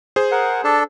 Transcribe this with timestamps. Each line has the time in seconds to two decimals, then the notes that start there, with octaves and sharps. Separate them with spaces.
0.16 G#4 C5
0.31 A#4 F#5
0.64 D4 A4 A5